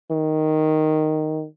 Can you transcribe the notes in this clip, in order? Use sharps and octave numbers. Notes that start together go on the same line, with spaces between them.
D#3